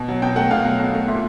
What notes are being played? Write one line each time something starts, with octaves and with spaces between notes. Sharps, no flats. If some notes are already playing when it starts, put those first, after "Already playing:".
Already playing: B2
F#3
B2 G5
A3 F#5
B2 F5
F#3
B2
A3
A#2 E5